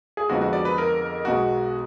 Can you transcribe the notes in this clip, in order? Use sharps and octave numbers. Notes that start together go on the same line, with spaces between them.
G#4
F2 D3 F3 G#3 B3 F#4
F#4
D5
B4
A#4
B1 B2 G#3 F#4